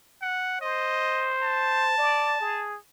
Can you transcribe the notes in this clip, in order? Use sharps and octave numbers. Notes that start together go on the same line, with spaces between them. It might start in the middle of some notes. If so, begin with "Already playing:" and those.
F#5
C5 D#5
A5
D5
G#4